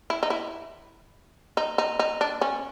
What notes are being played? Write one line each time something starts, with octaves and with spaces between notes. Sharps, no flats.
E4
D#4
E4
D#4
D#4
D#4
D4
C#4